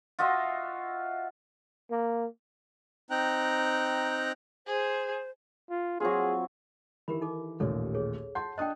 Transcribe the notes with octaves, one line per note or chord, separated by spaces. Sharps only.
F4 F#4 D#5 E5
A#3
C4 D#4 G5 A#5 F#6
G#4 C5
F4
F#3 C4 F4 G#4
D#3 E3 G4 A#4 B5
D#4 A4 D6
A1 D#2 A#2 A4 C#5
G#4 A4 C#5
F#5 A5 C6 G6
D4 D#5 G5 D#6 F#6